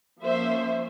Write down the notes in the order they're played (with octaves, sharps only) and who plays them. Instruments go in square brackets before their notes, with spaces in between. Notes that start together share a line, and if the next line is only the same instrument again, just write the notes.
[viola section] F3 A#3 C#4 C5 E5